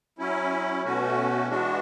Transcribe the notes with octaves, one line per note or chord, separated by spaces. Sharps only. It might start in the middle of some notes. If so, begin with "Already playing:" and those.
F#3 C#4 E4
B2 A3 C#4 F#4
E3 G#3 D4 F#4